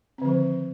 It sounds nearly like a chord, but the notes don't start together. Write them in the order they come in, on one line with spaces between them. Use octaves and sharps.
C4 D3 F3 D#3